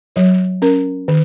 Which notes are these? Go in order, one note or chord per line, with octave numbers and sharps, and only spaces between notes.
F#3 C#5
C#4 A#4
D#3